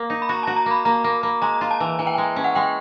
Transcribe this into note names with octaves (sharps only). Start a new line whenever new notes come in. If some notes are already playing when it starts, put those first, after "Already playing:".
Already playing: A#3
D#4
B5
F#4 A#5
F#4 A5
A#5
A#3
B5
A#3 A#5
A#3
A#3
G#3 A#5
F4 A#5
A5
E3
E3 G#5
G5
G#3 G#5
C#4
F#5
G#3 G5